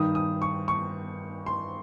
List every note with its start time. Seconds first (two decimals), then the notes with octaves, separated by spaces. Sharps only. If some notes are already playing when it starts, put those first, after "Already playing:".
Already playing: G2 D#3 D#6
0.15 D#6
0.42 C#6
0.68 C#6
1.46 C6